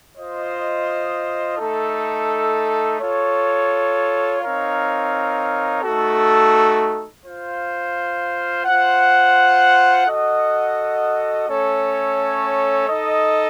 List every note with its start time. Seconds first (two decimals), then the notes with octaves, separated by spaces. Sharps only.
0.17 F4 C5 D#5
1.58 A3 D#4 A4
2.99 F4 A4 C#5
4.41 C4 D#4 A#4 C#5 F5
5.83 A3 D#4 F#4 A4
7.23 F4 C5 F5
8.65 F4 C5 F#5
10.06 F#4 A4 D#5 F#5
11.48 A3 C#4 A4 C#5
12.89 D#4 A4 D#5